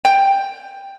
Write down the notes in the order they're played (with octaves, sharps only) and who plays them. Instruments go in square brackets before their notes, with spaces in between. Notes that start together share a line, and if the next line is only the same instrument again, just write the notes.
[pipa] G5